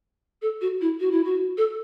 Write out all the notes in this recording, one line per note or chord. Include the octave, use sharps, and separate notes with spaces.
A4
F#4
E4
F#4
E4
F#4
A4